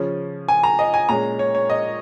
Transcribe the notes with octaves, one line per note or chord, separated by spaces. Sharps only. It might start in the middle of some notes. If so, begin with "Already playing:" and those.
Already playing: C#3 F3 C#4
G#5
A#5
D#5
G#5
A#2 G#3 C#4 A#5
C#5
C#5
D#5